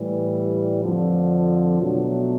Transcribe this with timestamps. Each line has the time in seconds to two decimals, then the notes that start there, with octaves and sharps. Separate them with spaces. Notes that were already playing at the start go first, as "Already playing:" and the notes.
Already playing: A2 E3 G3
0.83 F2 D3 F3
1.80 B2 F#3 A3 D4